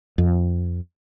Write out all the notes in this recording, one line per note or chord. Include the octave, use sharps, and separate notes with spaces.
F2